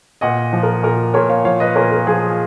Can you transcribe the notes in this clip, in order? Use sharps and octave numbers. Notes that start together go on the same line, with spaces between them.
A#2 D#5 F#5
F3
A#4
A#2 A#4
A#2 A#4 C#5
C#5 F5
F3 C#5 F5
B4 D#5
A#2 A#4 C#5
A#4
F3 G#4